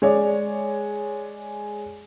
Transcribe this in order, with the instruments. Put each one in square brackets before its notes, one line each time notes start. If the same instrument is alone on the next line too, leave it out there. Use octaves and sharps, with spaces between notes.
[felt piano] G#3 C#5 D5